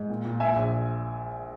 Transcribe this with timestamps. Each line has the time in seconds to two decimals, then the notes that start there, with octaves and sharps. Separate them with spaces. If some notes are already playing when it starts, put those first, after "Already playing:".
Already playing: G#2
0.10 A#2
0.25 A#2
0.40 A#2 E5 G#5
0.56 A#1